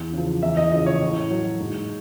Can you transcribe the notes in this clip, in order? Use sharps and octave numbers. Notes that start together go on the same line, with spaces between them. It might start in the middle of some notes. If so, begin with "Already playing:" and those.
Already playing: E2
C#3 F3
E2 E5
D#5
C#3 F3 D#5
C#5
A2
F#3
G#2